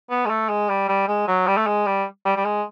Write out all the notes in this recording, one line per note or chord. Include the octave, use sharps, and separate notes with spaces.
B3
G#3
A3
G#3
G3
G3
G#3
F#3
G3
A3
G#3
G3
G3
G3
G#3